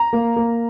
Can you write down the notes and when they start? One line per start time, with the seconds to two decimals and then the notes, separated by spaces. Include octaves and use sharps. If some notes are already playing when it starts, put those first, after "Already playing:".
Already playing: A#5
0.13 A#3
0.36 A#3